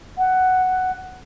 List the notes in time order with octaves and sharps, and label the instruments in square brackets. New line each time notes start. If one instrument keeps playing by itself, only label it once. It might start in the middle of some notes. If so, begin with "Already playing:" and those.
[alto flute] F#5